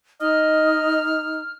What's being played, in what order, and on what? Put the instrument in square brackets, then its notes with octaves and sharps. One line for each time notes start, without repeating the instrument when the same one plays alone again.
[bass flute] D#4 [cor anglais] D#5 [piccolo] F6